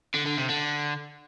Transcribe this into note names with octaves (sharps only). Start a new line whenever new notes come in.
D3
D3
C3
D3